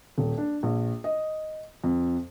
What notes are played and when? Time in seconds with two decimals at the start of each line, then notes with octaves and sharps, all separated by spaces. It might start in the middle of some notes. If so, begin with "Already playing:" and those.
0.18 D#1
0.38 D4
0.63 A#1
1.04 D#5
1.84 F2